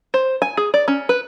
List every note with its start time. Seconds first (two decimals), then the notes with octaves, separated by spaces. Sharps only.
0.14 C5
0.42 G#5
0.57 G#4
0.74 D5
0.88 C#4
1.09 B4